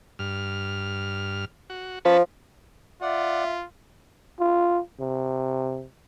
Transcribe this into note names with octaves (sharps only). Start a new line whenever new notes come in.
G2 F6
F#4
F3 C#4 B4 A5
F4 D5 E5 F#5
F4
C3